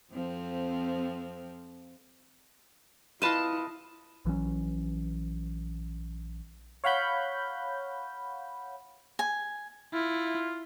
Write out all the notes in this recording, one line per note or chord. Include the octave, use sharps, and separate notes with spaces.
F2 F3 C4
E4 F4 B4 D#5 F5 A5
A#1 E3 F#3 C#4
C#5 F5 F#5 B5 G6
G#5
E4 F4